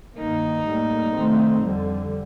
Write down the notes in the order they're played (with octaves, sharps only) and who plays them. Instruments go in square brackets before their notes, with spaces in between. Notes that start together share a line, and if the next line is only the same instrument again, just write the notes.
[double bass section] G2 D#3 A#3 [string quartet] D#4
[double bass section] A2 G3 A#3
C3 D#3 A3 C4
F2 D3 G3